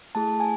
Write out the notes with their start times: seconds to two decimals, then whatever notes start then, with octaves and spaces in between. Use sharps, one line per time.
0.15 A3 E4 G#4 A5
0.40 G#5